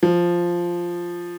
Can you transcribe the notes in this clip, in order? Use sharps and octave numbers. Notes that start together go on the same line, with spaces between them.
F3